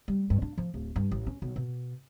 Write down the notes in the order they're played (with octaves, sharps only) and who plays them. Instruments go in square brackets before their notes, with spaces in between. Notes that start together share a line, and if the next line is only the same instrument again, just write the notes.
[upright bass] G3
G2
D4
F3
D1
G2
A1
C#4
B1
B2